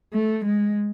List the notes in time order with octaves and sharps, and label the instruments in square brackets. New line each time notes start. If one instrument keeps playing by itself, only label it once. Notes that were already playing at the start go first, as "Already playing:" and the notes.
[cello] A3
G#3